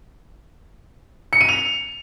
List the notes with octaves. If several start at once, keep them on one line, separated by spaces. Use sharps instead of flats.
C#7
D#7
F7